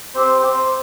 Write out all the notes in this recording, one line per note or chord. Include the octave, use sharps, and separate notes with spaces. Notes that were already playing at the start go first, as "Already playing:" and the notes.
C4 G4 C5
C5